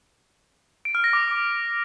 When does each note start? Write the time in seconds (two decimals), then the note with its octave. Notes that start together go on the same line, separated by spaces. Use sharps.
0.85 D7
0.95 F6
1.04 A#6
1.13 D6